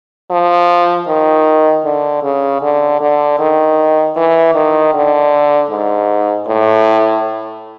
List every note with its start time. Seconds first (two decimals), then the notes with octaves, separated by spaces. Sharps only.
0.30 F3
1.08 D#3
1.85 D3
2.23 C#3
2.62 D3
3.01 D3
3.39 D#3
4.16 E3
4.55 D#3
4.94 D3
5.70 G#2
6.47 A2